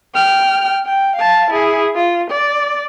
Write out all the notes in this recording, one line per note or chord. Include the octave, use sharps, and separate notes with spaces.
G5 F6
G5
F5 A5
E4 G#4
F4
D5